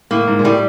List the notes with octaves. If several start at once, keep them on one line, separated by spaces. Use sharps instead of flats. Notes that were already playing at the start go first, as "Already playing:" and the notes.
A2 A#3
G#2
A#2
A2 G3